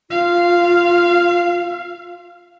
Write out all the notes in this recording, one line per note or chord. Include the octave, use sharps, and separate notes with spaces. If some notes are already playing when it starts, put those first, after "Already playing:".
F4 F5